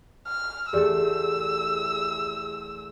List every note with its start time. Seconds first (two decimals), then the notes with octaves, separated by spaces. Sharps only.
0.27 F6
0.73 E2 A3 G4 G#4 D5 E6